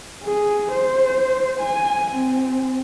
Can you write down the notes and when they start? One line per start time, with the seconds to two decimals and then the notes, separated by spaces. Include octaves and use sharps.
0.23 G#4
0.72 C5
1.59 G#5
2.11 C4